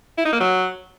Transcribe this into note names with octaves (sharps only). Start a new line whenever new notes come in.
E4
D#4
A#3
F#3